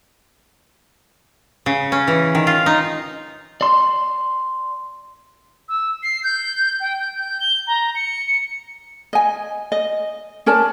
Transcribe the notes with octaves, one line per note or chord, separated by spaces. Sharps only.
C#3
C#4
E3
D#3
F4
D#4
D5 C6
E6
C7
G6
G5
G6
G6
G7
A#5
C#7
D#5 G#5
D#5
C#4 A#4 D5 A5